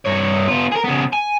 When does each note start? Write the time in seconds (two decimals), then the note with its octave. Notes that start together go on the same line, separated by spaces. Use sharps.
0.05 G2 C#5
0.48 B3 F4
0.72 G#4 A#4
0.84 C#3 B3
1.13 G#5